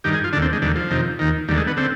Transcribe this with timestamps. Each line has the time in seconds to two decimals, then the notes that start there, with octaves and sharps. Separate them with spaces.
0.04 G2 D#3 G4
0.14 G#4
0.24 F4
0.33 D3 D4
0.36 D#2
0.42 C4
0.53 G#3
0.62 D#2 D3 G3
0.76 F3
0.91 F2 C3 D#3
1.19 D#2 D#3
1.48 D#2 D3 G3
1.58 G#3
1.67 B3
1.77 D3 C4